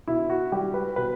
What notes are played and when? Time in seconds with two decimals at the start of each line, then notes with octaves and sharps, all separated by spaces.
0.07 B2 E4
0.30 F#4
0.52 G3 G4
0.74 B4
0.96 B2 B4